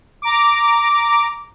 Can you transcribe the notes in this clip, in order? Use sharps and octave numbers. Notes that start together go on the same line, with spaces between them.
A#5 D6